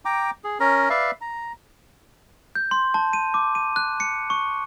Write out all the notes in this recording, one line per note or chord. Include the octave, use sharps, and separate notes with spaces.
G5 A#5 D6
G#4
C#4 A#4 A#5
B4 D5 E5 F5
A#5
G6
C6
A5
D#7
D6
D#7
F#6
C#7
C#6